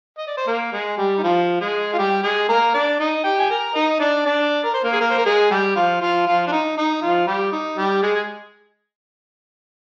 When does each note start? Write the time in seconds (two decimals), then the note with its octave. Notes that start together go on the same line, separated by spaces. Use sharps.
0.18 D#5
0.27 D5
0.37 C5
0.47 A#3 A#4
0.72 G#3 G#4
0.98 G3 G4
1.18 D#4
1.23 F3 F4
1.61 G#3 G#4
1.93 F4
1.98 G3 G4
2.23 G#3 G#4
2.48 A#3 A#4
2.74 D4 D5
3.00 D#4 D#5
3.24 G4 G5
3.39 G#5
3.50 A#4 A#5
3.75 D#4 D#5
3.99 D4 D5
4.26 D4 D5
4.63 A#4
4.74 C5
4.84 A#3 A#4
4.93 G#4
5.01 A#3 A#4
5.10 C5
5.18 A#4
5.26 G#3 G#4
5.51 G3 G4
5.76 F3 F4
6.01 F3 F4
6.27 F3 F4
6.47 D4
6.52 D#4
6.77 D#4
7.02 F3 F4
7.27 G3 G4
7.52 D#4
7.77 G3 G4
8.03 G#3 G#4
8.14 G#4